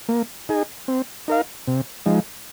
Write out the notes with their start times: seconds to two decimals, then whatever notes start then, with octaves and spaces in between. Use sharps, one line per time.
0.09 A#3
0.49 D#4 G#4
0.88 C4
1.28 D#4 A#4 F5
1.67 C3
2.06 F3 G#3 D#4